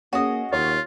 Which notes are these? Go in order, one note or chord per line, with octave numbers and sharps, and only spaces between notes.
A#3 C#4 F#4 G#4 D#5
D#2 F4 C#5